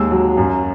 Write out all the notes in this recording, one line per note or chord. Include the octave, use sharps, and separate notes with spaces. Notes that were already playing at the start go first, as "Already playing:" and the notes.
Already playing: D#2 G#3 E6
F#3
F#2